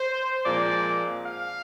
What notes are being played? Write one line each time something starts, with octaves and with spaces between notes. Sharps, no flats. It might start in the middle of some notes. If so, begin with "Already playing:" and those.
Already playing: C5
A#2 F3 G#3 C4 D5
F5